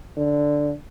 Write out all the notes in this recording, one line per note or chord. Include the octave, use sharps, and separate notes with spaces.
D3